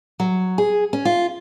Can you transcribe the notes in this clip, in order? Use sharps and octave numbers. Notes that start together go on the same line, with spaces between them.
F#3
G#4
C#4
F4